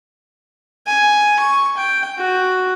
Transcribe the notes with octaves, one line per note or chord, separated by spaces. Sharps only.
G#5
C#6
G5
F#4